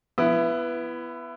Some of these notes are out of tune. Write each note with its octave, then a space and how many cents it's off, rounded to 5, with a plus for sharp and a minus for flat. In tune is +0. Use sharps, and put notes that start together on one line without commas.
B3 +0 E4 +25